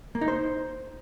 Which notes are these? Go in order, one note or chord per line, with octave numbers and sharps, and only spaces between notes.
A#3
D#4
C5